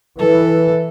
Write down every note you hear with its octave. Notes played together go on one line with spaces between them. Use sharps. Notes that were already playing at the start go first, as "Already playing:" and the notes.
E3 A4